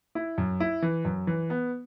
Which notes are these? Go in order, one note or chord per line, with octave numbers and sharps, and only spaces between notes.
E4
F#2
E4
E3
F#2
E3
B3